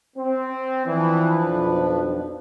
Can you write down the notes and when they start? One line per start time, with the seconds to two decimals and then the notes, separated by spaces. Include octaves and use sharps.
0.17 C4
0.87 E3 F3 D4 B4
1.46 B1 F2